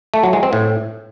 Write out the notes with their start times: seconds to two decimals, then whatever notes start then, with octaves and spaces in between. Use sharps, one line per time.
0.14 A3
0.23 F#3
0.33 G#3
0.43 C4
0.53 A2